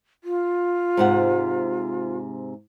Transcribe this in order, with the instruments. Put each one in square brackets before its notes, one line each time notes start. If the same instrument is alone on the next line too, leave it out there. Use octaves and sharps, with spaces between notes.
[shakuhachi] F4
[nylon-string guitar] G#2 C3 F#5